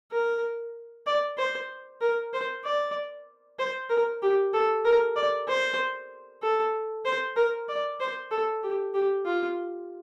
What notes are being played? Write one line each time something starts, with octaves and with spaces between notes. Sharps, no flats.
A#4
D5
C5
A#4
C5
D5
C5
A#4
G4
A4
A#4
D5
C5
A4
C5
A#4
D5
C5
A4
G4
G4
F4